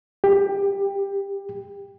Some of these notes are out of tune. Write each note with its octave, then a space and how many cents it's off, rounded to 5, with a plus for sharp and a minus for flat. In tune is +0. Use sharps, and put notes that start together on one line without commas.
G4 +15